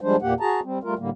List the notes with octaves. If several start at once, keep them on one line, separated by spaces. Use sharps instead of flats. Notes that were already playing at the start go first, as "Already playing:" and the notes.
F3 G3 G#3 D4 C5
E2 A#2 A#3 G4 F#5
F#4 G#4 A5 A#5
G3 C4
G3 A3 F4 A#4
A2 D3 G3 A#3